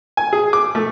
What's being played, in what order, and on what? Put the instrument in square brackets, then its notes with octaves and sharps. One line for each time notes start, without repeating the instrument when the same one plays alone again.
[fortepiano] G#5
G#4
D6
A3